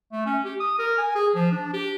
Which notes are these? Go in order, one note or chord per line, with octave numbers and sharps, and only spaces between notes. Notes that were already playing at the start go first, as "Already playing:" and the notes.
A3
C#4
G4
D#6
A#4
G#5
G#4
F3
D4
G4